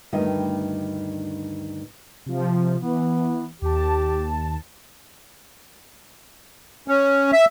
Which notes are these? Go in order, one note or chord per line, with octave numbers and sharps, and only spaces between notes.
D2 G2 D#3 G4 D#5
C3 F3
E3 B3
D#2 G4 A5
C#4
E5